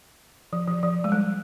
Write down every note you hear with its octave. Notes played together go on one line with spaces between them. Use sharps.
F3
F3
F3
G#3
G3